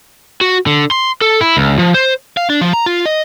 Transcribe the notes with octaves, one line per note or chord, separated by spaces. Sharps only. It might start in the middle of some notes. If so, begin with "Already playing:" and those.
F#4
D3
C6
A4
E4
C#2
F3
C5
F5
D4
F3
A#5
F4
D#5